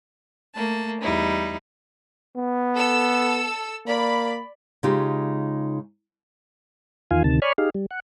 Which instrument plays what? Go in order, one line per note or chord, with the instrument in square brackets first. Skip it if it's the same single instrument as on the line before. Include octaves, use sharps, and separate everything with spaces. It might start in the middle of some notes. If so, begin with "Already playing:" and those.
[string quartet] A3 A#3 A5
E2 G3 D#4 E4
[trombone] B3
[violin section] A4 E6
[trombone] A#3 [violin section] D5 B5
[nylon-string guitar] C#3 G#3 D#4 F4 G4
[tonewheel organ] E2 D#3 F4 F5 G#5
D2 C3 D#3 A5
C#5 D5 G#5 B5 C#6 F6
D#4 G4 G#4 F5
G3
F#5